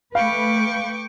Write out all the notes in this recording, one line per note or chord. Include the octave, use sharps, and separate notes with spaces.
A3 B4 F5 G5 C#6 D6